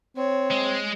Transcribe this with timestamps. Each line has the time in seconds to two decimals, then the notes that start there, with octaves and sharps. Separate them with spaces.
0.16 C4 C#5
0.51 G#3